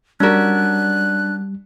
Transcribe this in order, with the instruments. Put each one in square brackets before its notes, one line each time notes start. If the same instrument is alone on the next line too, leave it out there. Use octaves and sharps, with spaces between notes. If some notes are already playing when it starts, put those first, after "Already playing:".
[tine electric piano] G3 [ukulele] C#4 F#4 A#4 [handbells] D4 D5 [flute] F#6